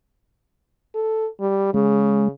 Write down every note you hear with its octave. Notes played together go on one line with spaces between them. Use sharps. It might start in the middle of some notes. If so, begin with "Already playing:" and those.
A4
G3
C#3 G#3